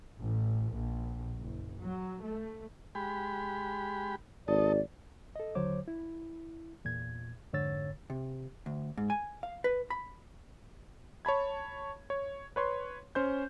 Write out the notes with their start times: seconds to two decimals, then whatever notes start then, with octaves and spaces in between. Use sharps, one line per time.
0.19 A1
0.72 A#1
1.37 F#1
1.80 F#3
2.22 A3
2.95 G#3 G4 B5
4.48 G#1 A4 D5 D#5
5.36 A4 D#5
5.55 D#2 D3 F#3 C5 C#5 D6
5.88 E4
6.85 E2 A#2 G#6
7.53 F2 G#2 D3 C#5 E6 A6
8.10 C3
8.66 D2
8.97 G#2
9.10 G#5
9.43 F5
9.64 B4
9.90 B5
11.25 C#5 A5 B5 G#6
12.10 C#5
12.56 B4 C#5 C6
13.15 C#4 C5 G6